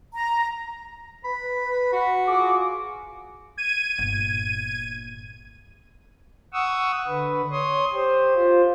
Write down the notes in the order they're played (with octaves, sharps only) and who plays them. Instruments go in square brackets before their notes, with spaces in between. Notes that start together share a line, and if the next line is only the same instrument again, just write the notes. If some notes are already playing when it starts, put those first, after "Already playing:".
[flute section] A#5
[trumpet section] B4 [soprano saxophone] B5
[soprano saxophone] F#4
[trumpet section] F4 G#4 D6
[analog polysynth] G#6 D#7
[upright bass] G1 A#2
[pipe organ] F#5 C#6 D#6 E6
D3 B4
C#5 C6 D#6
G4 C5
F4 C5